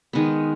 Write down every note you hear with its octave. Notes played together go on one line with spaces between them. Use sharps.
D#3 G#3 B3